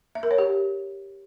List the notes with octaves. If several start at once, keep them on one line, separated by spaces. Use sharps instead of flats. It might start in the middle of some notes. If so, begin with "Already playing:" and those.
E5
A#4
C#5
G4